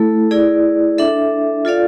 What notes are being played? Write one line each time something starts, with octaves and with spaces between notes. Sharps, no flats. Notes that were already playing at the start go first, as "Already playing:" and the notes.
Already playing: A3 E4 A4
E4 G#4 D5
D4 A4 E5
F4 A4 D5 F5